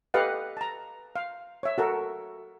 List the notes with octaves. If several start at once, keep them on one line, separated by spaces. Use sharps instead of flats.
G4 A4 B4 D#5 F5 F#5
A5 A#5
F5
C#5 E5
F#4 A4 A#4